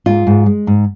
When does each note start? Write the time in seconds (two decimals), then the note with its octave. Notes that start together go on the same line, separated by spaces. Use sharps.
0.06 G#2 F4
0.27 G#2
0.46 G#3
0.67 G#2